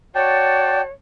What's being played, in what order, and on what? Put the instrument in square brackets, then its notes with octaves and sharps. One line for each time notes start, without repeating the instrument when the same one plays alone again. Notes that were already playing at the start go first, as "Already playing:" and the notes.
[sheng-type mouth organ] F#4 D5 A5 [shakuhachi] C#5 [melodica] G5